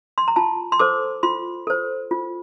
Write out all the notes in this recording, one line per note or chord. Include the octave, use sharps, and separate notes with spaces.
C6
A#5
F4 A5
C6
A4 C5 D6
F4 C6
A4 C5
F4